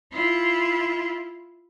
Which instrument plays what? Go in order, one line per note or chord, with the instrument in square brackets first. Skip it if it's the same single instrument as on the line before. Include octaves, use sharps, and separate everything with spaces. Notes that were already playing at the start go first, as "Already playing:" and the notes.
[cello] E4 F4